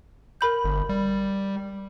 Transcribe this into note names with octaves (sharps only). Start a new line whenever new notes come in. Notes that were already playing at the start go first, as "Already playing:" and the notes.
A#4 B5 G6
G1
G3